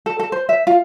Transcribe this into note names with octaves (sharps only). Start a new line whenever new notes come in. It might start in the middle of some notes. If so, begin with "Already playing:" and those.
A4
A4
C5
E5
F4